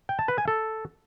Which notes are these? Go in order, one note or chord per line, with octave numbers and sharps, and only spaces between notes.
G5
A5
B4
G#5
A4